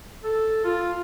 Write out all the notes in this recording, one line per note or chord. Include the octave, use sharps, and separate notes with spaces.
A4
F4